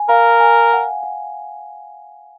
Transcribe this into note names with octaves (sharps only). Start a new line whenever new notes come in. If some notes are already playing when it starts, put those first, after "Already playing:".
Already playing: G#5
A#4 F5
G#5
F#5
F#5